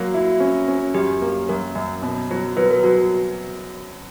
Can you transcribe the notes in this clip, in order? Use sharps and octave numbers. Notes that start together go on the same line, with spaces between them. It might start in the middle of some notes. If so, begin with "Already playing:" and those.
Already playing: F#3 A#3 F#4
E4
C#4
C#4
F#2 G4
A#3
F#2 A#4
F#2
B2
F#3
F#3 B4
A#4
F#3 F#4